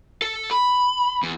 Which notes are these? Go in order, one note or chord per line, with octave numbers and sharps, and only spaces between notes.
A4
B5
E2